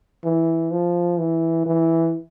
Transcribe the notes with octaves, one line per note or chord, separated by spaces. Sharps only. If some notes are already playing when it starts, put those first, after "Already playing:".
E3
F3
E3
E3